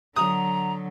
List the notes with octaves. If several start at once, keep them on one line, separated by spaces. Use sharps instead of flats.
D3 F#3 A#5 D#6